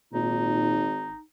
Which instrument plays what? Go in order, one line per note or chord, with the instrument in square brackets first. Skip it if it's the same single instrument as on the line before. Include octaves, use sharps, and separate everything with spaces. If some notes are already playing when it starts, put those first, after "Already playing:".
[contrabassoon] G#1 [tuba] A#2 [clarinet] D#4